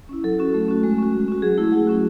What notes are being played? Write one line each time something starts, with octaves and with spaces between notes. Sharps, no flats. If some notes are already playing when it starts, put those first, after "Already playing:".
C#4 E4
F#3 A4
C#4 F#4
A3
C#4 F#4
G#3
C#4 F#4
G#3
C#4 F#4
F#3 G#4
A3 E4
F#3
C#4 F#4